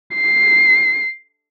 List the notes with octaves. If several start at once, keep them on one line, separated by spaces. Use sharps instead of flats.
C7